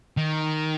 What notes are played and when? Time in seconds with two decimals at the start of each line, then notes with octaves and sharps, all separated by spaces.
0.17 D#3